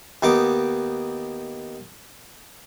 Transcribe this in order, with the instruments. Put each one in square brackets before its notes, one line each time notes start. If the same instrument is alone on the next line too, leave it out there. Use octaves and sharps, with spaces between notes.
[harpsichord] D#2 B3 D#4 D6